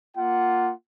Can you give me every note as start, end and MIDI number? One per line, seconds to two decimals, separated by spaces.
0.17 0.72 58
0.17 0.72 65
0.17 0.72 78